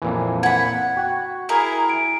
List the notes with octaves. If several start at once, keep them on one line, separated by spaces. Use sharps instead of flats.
F2 A#2 E3
F#5 B5 G#6
F#4 G5
E4 G#4 A#4
D7